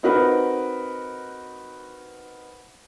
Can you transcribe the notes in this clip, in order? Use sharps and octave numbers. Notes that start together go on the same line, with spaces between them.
C4 D#4 F#4 A#4 B4